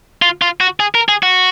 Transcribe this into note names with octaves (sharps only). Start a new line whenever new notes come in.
F4
F4
F#4
G#4
A#4
G#4
F#4